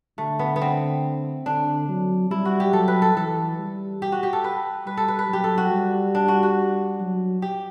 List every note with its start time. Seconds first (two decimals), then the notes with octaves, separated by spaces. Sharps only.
0.18 D3 A3
0.39 B3
0.56 B3
0.62 C4
1.46 D3 D4
1.89 F#3
2.31 G3 E4
2.45 F#4
2.60 G4
2.73 F#3 A4
2.88 B4
3.02 A4
3.16 E3 A4
3.59 G3
4.02 G4
4.12 F#4
4.23 G4
4.33 A4
4.44 B4
4.86 G3 B4
4.97 A4
5.08 B4
5.19 B4
5.29 F#3 G4
5.44 A4
5.58 F#4
5.72 G3
6.15 D4
6.28 F#4
6.43 F#4
7.00 F#3
7.42 G4